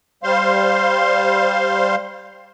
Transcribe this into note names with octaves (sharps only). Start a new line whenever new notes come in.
G3 C5 F5 C6